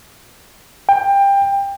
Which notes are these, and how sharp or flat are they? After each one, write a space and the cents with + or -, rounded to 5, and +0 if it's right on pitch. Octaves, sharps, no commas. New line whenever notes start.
G5 +20